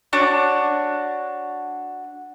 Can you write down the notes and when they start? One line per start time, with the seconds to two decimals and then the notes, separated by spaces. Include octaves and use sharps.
0.13 D4 F#4 C#5 D6